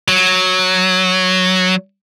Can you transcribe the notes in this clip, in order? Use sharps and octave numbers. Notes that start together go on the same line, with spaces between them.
F#3